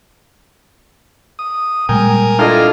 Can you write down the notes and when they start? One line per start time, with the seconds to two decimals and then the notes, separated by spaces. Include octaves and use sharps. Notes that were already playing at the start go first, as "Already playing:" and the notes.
1.39 D#6
1.89 A#2 G3 G#3 A#4 G5 G#5
2.39 D4 E4 F4 A4 D#5 F6